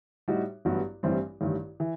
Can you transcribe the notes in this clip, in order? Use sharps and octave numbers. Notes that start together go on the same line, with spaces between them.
A2 G3 D#4 F#4
A1 G2 F#3 B3 F#4
A1 G2 E3 G3 C4
A1 G2 D#3
E3